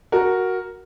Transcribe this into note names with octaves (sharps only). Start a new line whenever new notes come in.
F#4 A#4